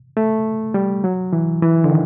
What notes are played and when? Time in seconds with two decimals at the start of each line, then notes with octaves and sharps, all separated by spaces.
0.17 A3
0.74 G3
1.04 F#3
1.33 E3
1.62 E3
1.84 D3
1.91 D#3